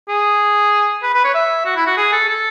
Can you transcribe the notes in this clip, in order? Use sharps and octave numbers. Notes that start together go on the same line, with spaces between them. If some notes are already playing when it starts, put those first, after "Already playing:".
G#4
B4
B4
C#5
E5
F#4
E4
F#4
G#4
A4
A4